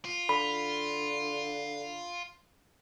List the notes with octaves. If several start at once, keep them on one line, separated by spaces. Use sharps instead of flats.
F4
D3 B5